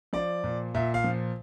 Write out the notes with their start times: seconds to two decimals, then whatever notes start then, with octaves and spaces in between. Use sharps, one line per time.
0.13 F3 D5
0.44 A#2
0.74 A#2 E5
0.94 F5
1.04 F3